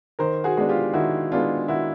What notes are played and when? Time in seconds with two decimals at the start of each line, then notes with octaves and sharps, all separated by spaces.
0.19 D#3 A#4 C5
0.44 F#4 G#4
0.57 G#3 B3 D4
0.69 F4 G4
0.93 D#3 E4 F#4
1.32 G#3 B3 D4 F4
1.68 D#3 E4 F#4